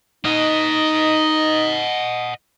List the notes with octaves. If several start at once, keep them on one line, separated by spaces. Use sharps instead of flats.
D#4 D#5 F#5